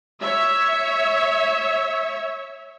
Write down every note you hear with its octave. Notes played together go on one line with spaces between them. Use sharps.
C#5 E5